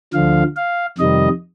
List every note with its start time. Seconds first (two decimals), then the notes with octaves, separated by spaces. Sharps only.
0.13 D2 D3 F3 F5
0.56 F5
0.98 F2 C3 D#3 G3 D#5